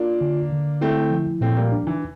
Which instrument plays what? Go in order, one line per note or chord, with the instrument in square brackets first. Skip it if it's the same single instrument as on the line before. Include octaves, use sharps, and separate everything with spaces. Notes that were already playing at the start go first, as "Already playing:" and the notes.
Already playing: [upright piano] A#3 D4 [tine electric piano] F4
[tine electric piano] D3
D3
[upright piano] A3 C4 [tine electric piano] E4
[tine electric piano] F3
[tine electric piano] A#2 [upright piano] A3 C4
[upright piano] G3 A#3
[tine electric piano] D4
[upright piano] E3